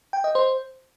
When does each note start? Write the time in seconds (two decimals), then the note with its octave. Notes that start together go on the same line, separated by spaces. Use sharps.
0.13 G5
0.24 D#5
0.35 C5